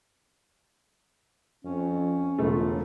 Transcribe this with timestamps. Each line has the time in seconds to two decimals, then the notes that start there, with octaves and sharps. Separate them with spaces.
1.65 F2 C#4
2.39 E1 C#2 A3 F4